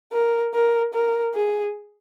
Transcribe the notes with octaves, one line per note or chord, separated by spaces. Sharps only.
A#4
A#4
A#4
G#4